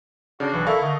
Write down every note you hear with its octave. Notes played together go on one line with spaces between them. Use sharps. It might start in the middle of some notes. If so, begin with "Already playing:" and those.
C#3 D4 F#4
B1 E3
E4 A4 A#4 F5 C#6
D3 A3 D#5